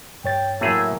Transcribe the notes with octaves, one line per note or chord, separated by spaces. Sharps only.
G2 C#5 G5 A6
A2 E3 F#3 A3 A#3 G#4 E5